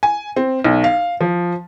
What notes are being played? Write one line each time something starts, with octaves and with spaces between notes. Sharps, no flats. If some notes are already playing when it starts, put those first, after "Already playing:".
G#5
C4
B1
F5
F3